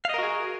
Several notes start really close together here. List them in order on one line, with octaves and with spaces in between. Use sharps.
F5 D#5 A#4 F#4 G#4